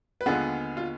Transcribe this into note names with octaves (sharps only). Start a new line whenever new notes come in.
B4
D#2 D3 G#3 B3 F4 G#4
F4